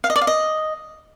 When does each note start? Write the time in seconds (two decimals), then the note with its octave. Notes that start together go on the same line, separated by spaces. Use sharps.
0.04 F5
0.10 D#5
0.16 D5
0.21 F5
0.27 D#5